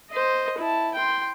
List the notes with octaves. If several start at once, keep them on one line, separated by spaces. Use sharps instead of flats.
C5 D#5
E4 A5
G5 C6